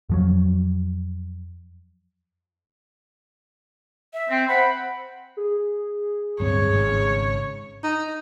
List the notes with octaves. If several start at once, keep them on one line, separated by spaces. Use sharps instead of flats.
F2 F3 F#3
E5
C4
C5 F#5 B5
G#4
D1 G2 C4 C#5
G#1 G#2 C#3
D#4